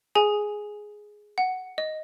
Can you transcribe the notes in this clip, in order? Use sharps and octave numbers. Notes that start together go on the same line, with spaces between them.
G#4 G#5
F#5
D#5